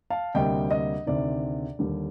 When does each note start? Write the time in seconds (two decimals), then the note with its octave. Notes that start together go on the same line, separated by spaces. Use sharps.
0.10 F5 A5
0.34 D2 C3 G3 A#3 D#5 G5
0.71 D#5
1.07 D2 C3 D#3 D5
1.79 D#2 D3 G3